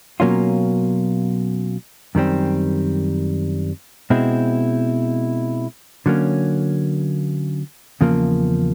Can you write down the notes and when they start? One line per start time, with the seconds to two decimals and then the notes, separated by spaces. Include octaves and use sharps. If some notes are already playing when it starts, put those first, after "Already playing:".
0.20 B2 F#3 A#3 C#4 F4
2.15 F#2 D#3 G3 C4
4.10 B2 G#3 C4 E4
6.06 D3 F#3 A#3 C#4
8.01 E2 C#3 F3 A#3